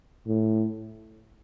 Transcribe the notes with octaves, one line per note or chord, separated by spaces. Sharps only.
A2